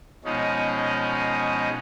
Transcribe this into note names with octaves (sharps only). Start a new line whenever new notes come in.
B2 F3 G#3 C#4 D#4